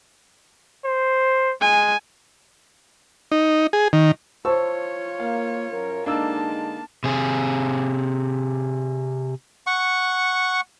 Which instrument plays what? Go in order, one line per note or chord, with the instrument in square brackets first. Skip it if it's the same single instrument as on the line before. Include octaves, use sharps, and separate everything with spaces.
[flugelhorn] C5
[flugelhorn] G#3 [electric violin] G#5
[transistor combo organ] D#4
G#4
D#3
[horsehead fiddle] F4 C#5 [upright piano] C5 [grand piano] A5 C#6 E6
[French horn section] A#3 [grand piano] F5
[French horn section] F#2 A#4
[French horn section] D3 G#3 D#4 [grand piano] A#3 D4 E6 [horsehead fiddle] A5
[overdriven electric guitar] C3 G#4
[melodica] F#5 C#6